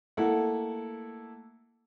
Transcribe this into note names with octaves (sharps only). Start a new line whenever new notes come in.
A3 A#3 E4 A4 F#5